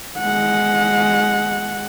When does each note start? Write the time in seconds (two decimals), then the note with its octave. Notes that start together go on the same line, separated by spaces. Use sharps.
0.19 G#3 F#5